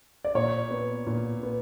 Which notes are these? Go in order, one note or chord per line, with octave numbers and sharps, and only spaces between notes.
D5
A#2 C#5
B3
A#2
B3